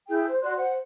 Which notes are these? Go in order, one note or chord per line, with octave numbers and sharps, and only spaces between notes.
E4 G#4 G5 G6
C5
F#4 D5 C6 F#6
C5 F#5